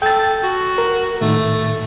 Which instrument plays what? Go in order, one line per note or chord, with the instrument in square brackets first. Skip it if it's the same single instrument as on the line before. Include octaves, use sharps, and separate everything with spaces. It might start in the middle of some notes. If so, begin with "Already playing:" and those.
[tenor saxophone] A4 [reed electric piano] G5 A6
[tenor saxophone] F#4
[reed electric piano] A#4
[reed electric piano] A2 D#3 [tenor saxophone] A3